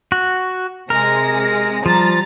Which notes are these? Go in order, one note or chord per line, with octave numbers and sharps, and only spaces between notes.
F#4
C3 G#3 A#4 A#6
F3 G3 A#5 A6